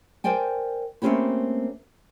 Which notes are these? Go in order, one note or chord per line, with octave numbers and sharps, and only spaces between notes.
A#4 C5 D5 G5 G#5
A3 A#3 C4 C#4 G4 B4